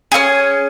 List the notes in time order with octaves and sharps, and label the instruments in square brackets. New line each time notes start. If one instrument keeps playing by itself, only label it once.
[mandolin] C#4 F4 G#4